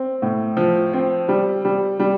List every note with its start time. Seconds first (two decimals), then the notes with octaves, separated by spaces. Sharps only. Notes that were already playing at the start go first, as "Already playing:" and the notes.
Already playing: C4
0.22 A2
0.57 F3
0.93 C4
1.28 G3
1.65 G3
1.99 G3